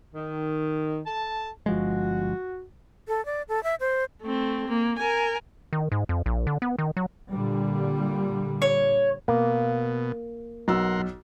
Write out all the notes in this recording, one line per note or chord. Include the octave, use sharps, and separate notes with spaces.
D#3
A4 A5
G1 F3 G#3 F#4
A4
D5
A4
E5
C5
A3 C4
A#3
A#4 G#5
D#3
G#2
F2
A#1
D3
B3
D#3
F#3
A#2 D3 G3
C#5
B2 A#3
B1 A#4 F#5 C6 E6